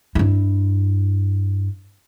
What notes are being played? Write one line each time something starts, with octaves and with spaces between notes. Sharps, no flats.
G2 E4